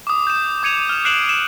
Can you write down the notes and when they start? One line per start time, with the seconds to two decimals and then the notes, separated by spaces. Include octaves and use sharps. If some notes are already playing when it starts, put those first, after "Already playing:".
0.07 D6 D#6
0.27 G6 E7
0.63 D6 G#6 C#7 D#7 F7
0.89 F6 E7
1.04 F6 F#6 C7 D7 E7 F#7
1.29 E7